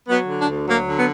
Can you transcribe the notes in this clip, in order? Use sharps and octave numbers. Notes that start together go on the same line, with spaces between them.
F#3 B3
D3
D4
D2
F#3 A#3
D3
B3